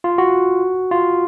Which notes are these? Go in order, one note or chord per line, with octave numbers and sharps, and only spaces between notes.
F4
F#4
F4